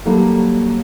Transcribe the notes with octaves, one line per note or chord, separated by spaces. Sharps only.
F#3 G3 A#3 D#4 A4 A#4